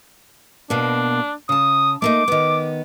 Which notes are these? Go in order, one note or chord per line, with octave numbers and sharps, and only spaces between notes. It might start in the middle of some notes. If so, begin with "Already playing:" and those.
B2 A#3 D4
C#3 A5 D#6
A3 A#3 D#4 D6
D#3 B3